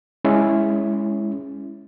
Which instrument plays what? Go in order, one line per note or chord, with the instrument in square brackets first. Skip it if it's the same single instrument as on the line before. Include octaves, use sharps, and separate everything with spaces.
[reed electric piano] G#3 C#4 E4